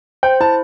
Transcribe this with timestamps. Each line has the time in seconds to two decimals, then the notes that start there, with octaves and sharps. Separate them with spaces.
0.23 C5 G5
0.40 E4 A5